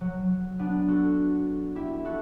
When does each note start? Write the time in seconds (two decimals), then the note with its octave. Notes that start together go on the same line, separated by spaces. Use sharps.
0.01 F#3
0.59 B3 D4
0.88 F#4 A4
1.75 E4 G4
2.05 F#4 A4